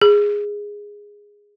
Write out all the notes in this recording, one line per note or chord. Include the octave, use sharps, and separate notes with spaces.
G#4